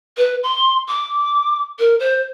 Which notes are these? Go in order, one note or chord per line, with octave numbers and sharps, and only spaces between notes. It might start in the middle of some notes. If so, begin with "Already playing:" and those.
B4
C6
D6
A#4
C5